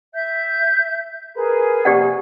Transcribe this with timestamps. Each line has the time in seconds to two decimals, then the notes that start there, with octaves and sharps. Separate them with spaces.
0.14 E5 G6
1.37 G#4 A#4 B4
1.85 F2 C3 A#3 G4 D5 F#5